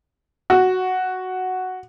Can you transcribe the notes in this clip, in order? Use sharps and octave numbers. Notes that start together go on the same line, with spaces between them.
F#4